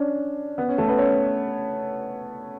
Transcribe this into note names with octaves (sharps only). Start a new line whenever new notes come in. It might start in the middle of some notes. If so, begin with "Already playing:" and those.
Already playing: C#4 D4
B3
C#4
A3 A4
B3 B4
C#4 C#5